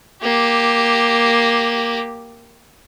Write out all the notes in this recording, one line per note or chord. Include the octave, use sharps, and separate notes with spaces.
A#3 G4